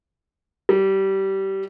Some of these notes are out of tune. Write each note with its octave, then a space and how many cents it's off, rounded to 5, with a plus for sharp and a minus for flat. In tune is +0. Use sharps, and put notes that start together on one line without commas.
G3 -20